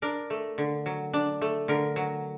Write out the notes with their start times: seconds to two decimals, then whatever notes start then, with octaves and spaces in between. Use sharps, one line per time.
0.02 D4 A#4
0.30 A3
0.58 D3
0.86 F#3
1.13 D4
1.41 A3
1.68 D3 A#4
1.96 F#3